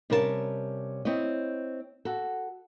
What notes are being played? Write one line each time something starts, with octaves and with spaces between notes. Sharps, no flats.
C3 G3 C#4 A#4 C#5 A5
C4 E4 C#5 D#5
F#4 A4